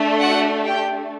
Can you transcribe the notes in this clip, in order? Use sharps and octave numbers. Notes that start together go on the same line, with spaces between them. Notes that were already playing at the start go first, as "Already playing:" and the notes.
Already playing: A3 D4
F#4 F#5
G4 G5